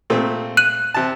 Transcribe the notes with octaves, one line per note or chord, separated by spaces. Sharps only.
A#2 A3 C4
F#6 D#7 F#7
C3 A5